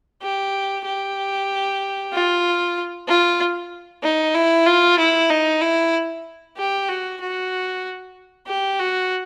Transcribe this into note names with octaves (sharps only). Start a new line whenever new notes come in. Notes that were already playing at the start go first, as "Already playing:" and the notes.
G4
G4
F4
F4
D#4
E4
F4
E4
D#4
E4
G4
F#4
F#4
G4
F#4